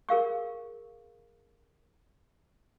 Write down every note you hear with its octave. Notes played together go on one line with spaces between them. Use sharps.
G#4 A#4 F5 C#6